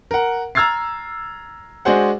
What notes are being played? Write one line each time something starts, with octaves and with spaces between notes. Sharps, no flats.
A#4 F#5
A#5 E6 F6 G#6 A6 C7
G#3 D4 F#4 G#4 C5 F#5